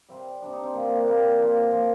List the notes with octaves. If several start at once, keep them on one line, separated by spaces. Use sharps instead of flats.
C3 G3 C4
C3 G3 D4
D#4
C4
C3 G3 A#3
C4
A#3
C3 G3 A#3
A#2 F3 C4
A#2 F3